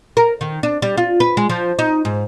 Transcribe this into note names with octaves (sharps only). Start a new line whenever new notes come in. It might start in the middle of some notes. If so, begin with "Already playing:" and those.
A#4
D#3
D4
G3
F4
B4
G#3
F3
D#4
G#2